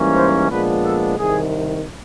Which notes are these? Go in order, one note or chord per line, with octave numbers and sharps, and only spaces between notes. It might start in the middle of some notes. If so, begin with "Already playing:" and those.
Already playing: G#2 E3 G3 A#3 C#4
C5
A#2 F3 G#3 B3 D4 B4
A4
C2 C3 D#3 G#4